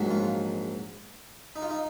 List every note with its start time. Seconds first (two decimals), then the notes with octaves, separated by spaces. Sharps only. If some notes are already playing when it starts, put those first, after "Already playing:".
Already playing: A#1 G#2 F#3
0.11 F4
1.56 D#4
1.62 F4
1.71 D#4